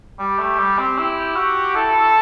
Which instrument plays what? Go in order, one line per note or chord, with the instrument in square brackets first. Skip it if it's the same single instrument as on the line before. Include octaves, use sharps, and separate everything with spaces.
[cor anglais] G3 [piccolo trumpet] G4
[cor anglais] A3
G3
C4
E4
F#4
[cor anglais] E4 [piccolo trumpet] A4
[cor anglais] E4